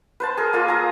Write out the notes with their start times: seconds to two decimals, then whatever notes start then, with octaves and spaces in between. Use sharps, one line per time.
0.20 B4 C5 A5
0.37 G#4 A#4
0.53 A#3 F4 A4
0.68 G#4 A#5